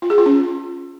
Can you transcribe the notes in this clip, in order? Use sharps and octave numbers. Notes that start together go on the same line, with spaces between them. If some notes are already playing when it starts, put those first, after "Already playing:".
F4
G#4
F4
C#4